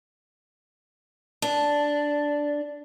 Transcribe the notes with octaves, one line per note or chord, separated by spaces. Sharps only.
D4